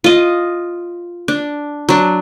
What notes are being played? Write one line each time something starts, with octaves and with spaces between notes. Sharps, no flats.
F4 D#5
D4
F#3 D4